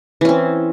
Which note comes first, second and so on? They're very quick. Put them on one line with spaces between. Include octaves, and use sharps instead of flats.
E3 C#4 C4